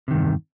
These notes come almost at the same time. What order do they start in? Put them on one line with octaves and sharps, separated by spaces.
C3 D#3 G2 E2